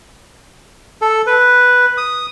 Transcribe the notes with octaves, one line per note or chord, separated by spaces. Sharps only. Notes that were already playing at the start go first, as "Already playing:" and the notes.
A4
B4
D#6